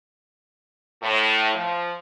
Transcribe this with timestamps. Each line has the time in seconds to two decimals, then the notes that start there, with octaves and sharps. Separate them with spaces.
1.03 A2
1.55 F3